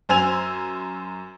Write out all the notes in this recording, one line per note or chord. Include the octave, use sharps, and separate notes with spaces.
F#2 C5 G#5 E6 G#6 F7